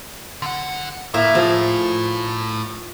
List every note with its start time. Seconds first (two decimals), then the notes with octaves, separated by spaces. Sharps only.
0.42 D3 F#5
1.14 A2 A#3 E4 A#4
1.35 F3 G#4 A#4